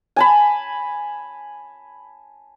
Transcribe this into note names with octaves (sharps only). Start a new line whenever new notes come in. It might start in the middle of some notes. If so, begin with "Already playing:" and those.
G#5 A5 B5